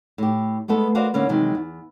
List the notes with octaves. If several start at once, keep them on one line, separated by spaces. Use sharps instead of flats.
A2 G4
G#3 A3 B3 A4
F#4 A#4 C5 D5 D#5 F5
D3 A#3 C#4 B4
C3 D#3 E3 F#3 G#3
E2